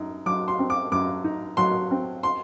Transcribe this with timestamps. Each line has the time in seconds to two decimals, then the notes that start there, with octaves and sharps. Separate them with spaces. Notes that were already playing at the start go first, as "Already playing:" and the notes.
Already playing: F#2 D#4
0.26 F#3 D6
0.48 C6
0.59 C4
0.70 D6
0.92 F#2 D6
1.24 D#4
1.57 F#3 C6
1.91 C4
2.23 C6